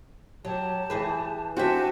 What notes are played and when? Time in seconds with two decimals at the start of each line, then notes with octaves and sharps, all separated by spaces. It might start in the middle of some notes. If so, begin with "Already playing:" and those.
0.45 F#3 G4 A5
0.90 E3 G#4 B4
1.57 C4 D4 F#4 G4 E5 G#5 A5